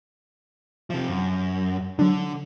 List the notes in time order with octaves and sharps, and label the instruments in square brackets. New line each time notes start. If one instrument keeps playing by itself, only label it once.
[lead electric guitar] C3 F3
F#2
[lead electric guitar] D3 [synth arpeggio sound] F#3 D4